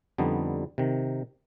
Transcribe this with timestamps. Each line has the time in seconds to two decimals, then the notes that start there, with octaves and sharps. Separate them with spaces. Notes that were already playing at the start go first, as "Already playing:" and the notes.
0.18 F2 D3 G3 B3 D#4
0.78 C3 D#3